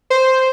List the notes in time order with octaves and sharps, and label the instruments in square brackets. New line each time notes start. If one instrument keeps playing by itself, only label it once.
[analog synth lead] C5